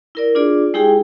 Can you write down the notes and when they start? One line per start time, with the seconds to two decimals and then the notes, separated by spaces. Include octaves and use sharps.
0.15 E4 A#4 D5
0.35 D4 F4 G#4 D5
0.74 G#3 D#4 E4 G4 G#4 G5